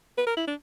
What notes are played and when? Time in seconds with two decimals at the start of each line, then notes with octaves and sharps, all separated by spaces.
0.18 B4
0.27 A#4
0.37 E4
0.47 D4